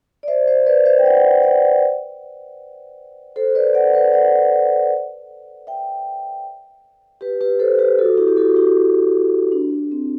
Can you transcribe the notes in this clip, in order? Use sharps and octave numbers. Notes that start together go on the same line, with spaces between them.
D5
C5 E5
C5 E5
B4 D5
C5 E5
G5
D5 F#5
D5 F#5
A4 C5
B4 D5
D5 F#5
B4 D5
D5 F#5
E5 G5
G4 B4
G4 B4
A4 C5
G4 B4
F#4 A4
E4 G4
G4
F#4 A4
E4 G4
D4
C4